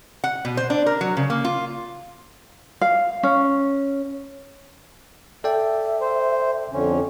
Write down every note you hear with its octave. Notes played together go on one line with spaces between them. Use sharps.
F#5
B2
C5
D4
A#4
F#3
C#3
A#3
F4
F5
C#4
A4 D5 E5 G5
C5
F2 D3 C#4